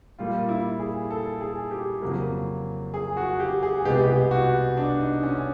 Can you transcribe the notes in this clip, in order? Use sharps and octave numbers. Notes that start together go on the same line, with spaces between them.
A#2 G3 A#3 F4
E4
G#4
A4
G#4
G4
F2 C#3 F#3 A#3
G#4
F#4
G4
G#4
C2 B2 G#3 B3 G4
G#4
G4
F#4
D4
D#4
C#4